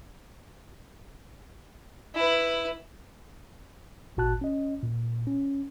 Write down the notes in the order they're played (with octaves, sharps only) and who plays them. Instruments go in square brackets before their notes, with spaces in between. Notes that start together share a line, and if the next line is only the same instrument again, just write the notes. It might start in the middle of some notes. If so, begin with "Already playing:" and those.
[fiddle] E4 B4
[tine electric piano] G#1 A#2 F#4 A5 F#6
C#4 D#5
A#2
C#4